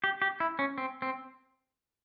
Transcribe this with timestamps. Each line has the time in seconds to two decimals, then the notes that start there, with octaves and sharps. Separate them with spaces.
0.04 G4
0.22 G4
0.40 E4
0.59 C#4
0.78 C4
1.02 C4